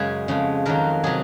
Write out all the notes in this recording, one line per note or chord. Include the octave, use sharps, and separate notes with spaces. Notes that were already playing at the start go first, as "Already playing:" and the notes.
Already playing: F#2 C#3 G#3 G#4
F2 C#3 G#3
F2 D#3 F#3 A#4
C3 F#3 G#4